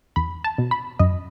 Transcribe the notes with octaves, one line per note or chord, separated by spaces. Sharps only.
E2 B5
A5
B2
B5
F#2 D#5